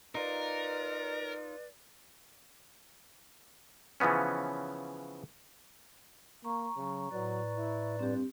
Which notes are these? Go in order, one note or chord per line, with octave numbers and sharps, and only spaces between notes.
D#4 F4 A#4 B4 D5
C#3 E3 F3 B3 C#4
A#3 A#5 C#6
C#3 F#3
A2 F#3 B4 D5
E4
G2 C4 G4